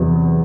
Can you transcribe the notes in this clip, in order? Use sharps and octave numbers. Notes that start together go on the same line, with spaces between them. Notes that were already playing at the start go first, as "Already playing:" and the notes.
Already playing: E2 C3 F#3